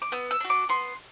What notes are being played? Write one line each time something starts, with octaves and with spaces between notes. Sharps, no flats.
D6
B3 E6
E6
D4 F#4
D6
B3 C6